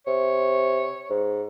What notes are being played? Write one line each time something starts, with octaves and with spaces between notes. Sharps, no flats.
C3 C#5
G#2